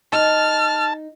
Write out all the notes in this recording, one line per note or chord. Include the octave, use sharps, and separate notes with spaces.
D#4 A5 F6